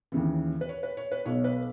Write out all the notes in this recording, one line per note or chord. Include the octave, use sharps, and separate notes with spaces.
D#2 C#3 E3
B4
C#5
B4
C#5
B4
B1 B2 C#5
B4